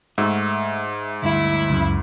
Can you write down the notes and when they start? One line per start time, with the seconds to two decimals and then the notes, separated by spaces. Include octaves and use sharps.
0.18 G#2 A3 F#4 E5
1.23 D2 G2 E4
1.70 C#2 F#2